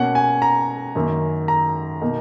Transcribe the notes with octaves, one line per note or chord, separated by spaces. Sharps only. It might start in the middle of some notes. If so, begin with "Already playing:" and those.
Already playing: B2 A#3 C#4 F#5
G#5
A#5
F#2 D#3 A#3 C#4
A#5
B2 A#3 D#4